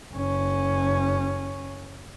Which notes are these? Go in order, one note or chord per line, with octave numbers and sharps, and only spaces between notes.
F#1 C#4